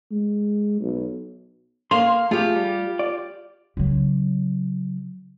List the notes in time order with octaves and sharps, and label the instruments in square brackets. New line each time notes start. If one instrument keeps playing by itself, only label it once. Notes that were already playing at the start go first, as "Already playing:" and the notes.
[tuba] G#3
B1
[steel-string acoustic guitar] A#3 F5 [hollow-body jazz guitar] C6
[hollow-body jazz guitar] A3 G#4 [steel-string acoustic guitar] F4 G4
[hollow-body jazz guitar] G3
D5
[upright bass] C#3 F#3